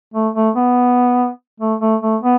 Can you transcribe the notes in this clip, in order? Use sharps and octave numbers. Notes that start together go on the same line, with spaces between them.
A3
A3
B3
A3
A3
A3
B3